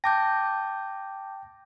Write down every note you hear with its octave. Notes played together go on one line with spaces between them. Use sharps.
G5 A5 D6 G6 A#6